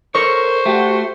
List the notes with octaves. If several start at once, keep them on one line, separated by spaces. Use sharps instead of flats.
A4 A#4 C5 C#5 C#6
A3 F#4 G4